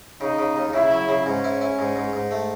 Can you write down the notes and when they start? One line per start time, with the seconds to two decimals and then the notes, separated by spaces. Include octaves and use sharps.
0.21 C#3 D#4
0.39 C#3
0.56 D#2
0.73 C#3 E4
0.91 F#3
1.09 C#3
1.26 G#2 C#4
1.44 E4
1.61 E4
1.79 G#2
1.96 G#2
2.13 G#2
2.31 A3